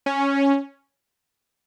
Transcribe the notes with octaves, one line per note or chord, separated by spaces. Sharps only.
C#4